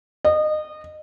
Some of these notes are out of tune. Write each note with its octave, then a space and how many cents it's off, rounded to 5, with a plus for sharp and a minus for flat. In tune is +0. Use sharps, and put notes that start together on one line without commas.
D#5 -25